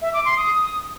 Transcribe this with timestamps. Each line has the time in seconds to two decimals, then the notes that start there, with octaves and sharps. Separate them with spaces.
0.02 E5
0.13 D6
0.25 C6
0.37 D#6